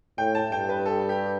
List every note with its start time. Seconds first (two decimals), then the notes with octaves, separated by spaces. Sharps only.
0.17 A2 G5
0.35 A5
0.51 G2 G5
0.69 B4
0.86 A4
1.09 G4